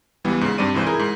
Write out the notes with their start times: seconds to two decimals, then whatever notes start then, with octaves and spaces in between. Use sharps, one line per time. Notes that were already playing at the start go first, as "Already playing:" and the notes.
0.24 C#2 E3 G3 B3
0.41 G#2 C#3
0.58 G2 G3 C4 D5 D#7
0.74 C2 G#2 E3 C5 G6
0.86 E4 G#4 A#4
0.99 G#2